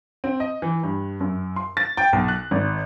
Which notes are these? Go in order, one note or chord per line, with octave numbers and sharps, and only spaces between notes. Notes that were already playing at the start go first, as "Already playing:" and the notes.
C4
D#5
E3
G2
F#2
C6
A6
G5
B1
F#6
G#1